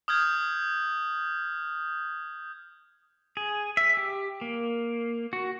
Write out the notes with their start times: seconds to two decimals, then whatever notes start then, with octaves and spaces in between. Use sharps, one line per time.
0.08 D#6 F6 G6 G#6
3.37 G#4
3.77 E5
3.97 G4
4.41 A#3
5.33 F#4